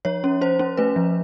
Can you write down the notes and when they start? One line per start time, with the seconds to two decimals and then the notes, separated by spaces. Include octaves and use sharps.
0.05 F3 C#5
0.24 C#4
0.41 C#4 C5
0.59 C#4
0.77 A3 B4
0.96 F3